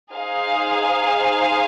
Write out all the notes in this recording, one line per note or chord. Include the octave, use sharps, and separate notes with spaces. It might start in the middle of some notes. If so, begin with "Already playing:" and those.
D#4 G#4 C5 F5